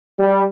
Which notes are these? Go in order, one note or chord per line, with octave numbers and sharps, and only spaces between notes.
G3